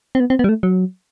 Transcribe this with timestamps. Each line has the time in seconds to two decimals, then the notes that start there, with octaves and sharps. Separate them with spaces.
0.15 C4
0.20 B3
0.30 C4
0.39 B3
0.44 G3
0.49 A3
0.63 F#3